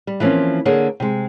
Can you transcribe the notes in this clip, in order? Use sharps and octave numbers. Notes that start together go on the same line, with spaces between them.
G3
E3 F3 A#3 C4 C#4
D3 A#3 G#4 C#5
C3 G#3